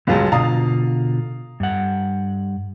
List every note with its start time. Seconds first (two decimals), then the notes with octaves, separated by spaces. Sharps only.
0.07 C#2 G2 F#3 G#3 F5 A5
0.32 B2 D3 F4 F5 A#5 D#6
1.60 G2 F#5